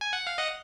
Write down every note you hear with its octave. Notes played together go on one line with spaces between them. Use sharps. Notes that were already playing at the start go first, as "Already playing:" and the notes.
G#5
F#5
F5
D#5 F#5